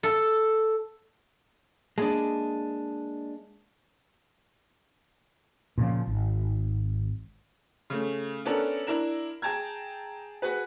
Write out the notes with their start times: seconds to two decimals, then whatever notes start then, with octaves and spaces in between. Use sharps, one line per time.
0.03 A4
1.98 G#3 A#3 D4 G#4 A5
5.78 A#2 C#3 E3 F3
6.07 G#1
7.90 C#3 A3
8.45 B3 C#4 D4 A4 A#4
8.87 D4 E4 A#4 E7
9.42 G#4 G5 A5 A#5 G#6
10.42 F#4 G#4 B4